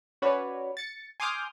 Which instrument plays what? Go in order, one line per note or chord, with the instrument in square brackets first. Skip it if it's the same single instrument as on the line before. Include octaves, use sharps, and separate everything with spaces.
[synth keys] C#4 F#4 B4 C#5 D5
A6 C#7
G#5 C6 D6 D#6 F6 G6